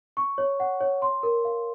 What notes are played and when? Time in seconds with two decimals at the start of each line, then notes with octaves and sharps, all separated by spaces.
0.17 C#6
0.38 C#5
0.60 F#5
0.81 C#5
1.02 C6
1.23 A#4
1.45 F5